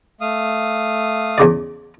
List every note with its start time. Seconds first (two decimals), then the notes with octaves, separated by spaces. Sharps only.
0.21 A3 F5 D#6
1.38 E2 C#3 D5